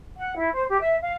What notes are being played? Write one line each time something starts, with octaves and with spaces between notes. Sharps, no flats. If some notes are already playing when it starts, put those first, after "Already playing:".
F#5
E4
C5
G4
E5
F5